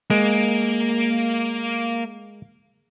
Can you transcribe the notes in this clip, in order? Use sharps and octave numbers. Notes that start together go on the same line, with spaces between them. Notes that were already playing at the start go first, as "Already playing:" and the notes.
G#3 A#3